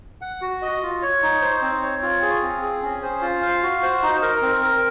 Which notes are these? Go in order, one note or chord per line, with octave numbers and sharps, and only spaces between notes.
F#5
F#4
D#5
F4
C#5
D#4
C5
C4
C#5
F4
G#4
C4
G#4
C#4
C5
F4
F5
F#4
C5
D#4
A#4
C4
A#4